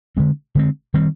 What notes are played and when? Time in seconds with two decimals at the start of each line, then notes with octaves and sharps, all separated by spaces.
0.17 D3 G#3 C4
0.55 D3 G#3 C4
0.94 D#3 G3 C4